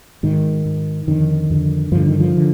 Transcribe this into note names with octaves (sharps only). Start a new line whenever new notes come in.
G#2 D#3
G#2
F2 D3 D#3
F2 D3
G2 D3 F3
D#3
F3
D3